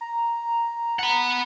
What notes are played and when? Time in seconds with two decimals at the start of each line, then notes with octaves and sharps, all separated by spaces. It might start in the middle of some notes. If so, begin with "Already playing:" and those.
0.01 A#5
0.99 F#5 B5